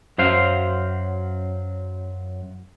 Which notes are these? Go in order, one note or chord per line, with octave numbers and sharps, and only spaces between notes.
F#2 F#3 C5 F5